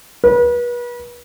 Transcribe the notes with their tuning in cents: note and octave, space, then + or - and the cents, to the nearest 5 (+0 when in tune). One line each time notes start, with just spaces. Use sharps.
B4 -35